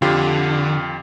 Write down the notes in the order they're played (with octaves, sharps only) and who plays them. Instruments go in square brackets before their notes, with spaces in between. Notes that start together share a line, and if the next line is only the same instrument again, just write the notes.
[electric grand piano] F2 F4 G4 [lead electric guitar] D3